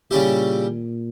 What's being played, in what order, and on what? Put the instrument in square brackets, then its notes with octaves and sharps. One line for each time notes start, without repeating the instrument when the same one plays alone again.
[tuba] A#2 [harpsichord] C#3 G3 C#4 E4 G4